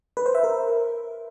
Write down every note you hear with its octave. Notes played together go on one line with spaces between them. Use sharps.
B4
C5
E5
A#4